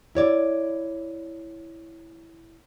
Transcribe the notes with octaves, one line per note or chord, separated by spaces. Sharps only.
E4 C#5 D5